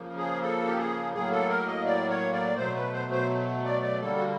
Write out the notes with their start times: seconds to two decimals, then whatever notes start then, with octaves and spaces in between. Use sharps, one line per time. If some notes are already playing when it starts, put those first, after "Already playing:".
Already playing: C#3 F3 A#3
0.17 G#4
0.42 A4
0.67 G4
0.77 G#4
1.13 A2 F#3 A#3 G#4
1.32 A4
1.49 A#4
1.67 D#5
1.86 D5
2.09 C#5
2.33 D5
2.57 B2 F#3 A3 C5
2.75 B4
2.93 C5
3.11 C5
3.65 D5
3.82 D5
4.00 D3 G3 A#3 A4
4.18 F#4